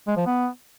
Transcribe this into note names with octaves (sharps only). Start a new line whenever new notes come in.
G#3
F3
B3